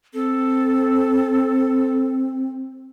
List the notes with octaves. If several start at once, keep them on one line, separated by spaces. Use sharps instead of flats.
C4 A4